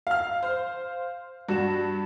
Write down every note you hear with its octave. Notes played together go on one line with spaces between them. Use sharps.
F5 F6
C5
G2 F#4 E7